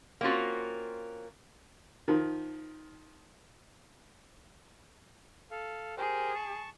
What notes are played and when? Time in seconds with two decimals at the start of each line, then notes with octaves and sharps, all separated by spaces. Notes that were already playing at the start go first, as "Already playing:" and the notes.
0.21 A#3 C4 C#4 F4 F#4
2.08 D#3 F3
5.51 A4 F5
5.98 G4 G#4 A#4 C5
6.35 A5 C#6